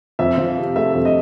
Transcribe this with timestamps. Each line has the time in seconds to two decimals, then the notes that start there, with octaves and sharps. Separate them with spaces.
0.19 F2 E5
0.38 F3
0.58 C3
0.76 A3 E5
0.95 F2
1.05 D#5